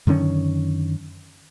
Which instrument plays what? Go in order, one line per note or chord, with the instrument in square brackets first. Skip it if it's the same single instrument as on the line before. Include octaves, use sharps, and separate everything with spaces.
[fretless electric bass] F#2 D3 D#3 C#4